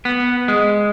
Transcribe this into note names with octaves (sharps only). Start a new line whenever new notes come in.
B3
G#3